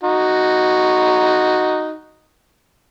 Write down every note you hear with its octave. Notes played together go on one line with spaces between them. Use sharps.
D#4 F#4